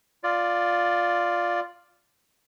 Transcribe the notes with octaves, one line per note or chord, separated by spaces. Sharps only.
F4 D5